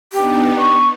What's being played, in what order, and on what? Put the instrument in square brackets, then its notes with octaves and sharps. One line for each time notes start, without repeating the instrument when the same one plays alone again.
[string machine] B3 D4 D#4 [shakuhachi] G4
[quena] C#6